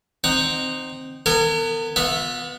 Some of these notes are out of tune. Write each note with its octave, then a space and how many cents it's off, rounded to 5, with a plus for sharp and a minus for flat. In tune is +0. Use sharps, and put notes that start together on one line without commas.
C4 +0 D#4 -15 F#5 +15
B3 +0 A#4 -45 G#5 +0
B3 +0 F4 +45 E5 +0